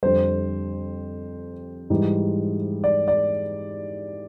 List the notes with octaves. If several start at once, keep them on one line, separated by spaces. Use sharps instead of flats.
F2 D3 G3 C5
G#2 E3 G3
D5
D5